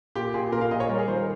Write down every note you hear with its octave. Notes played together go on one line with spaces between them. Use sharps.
A#2 G4
A#2 G#4
A#2 A#4
F5
A#2 D#5
C#5
G3 A#4
G#4
D#3 C5
A#4